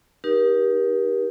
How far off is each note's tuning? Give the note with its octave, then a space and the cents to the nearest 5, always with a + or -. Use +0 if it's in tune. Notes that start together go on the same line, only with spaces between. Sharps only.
D#4 +0 G4 +0 A#4 +35